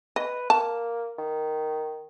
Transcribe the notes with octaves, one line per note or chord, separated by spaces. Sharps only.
B4 D#5
A#3 A5
D#3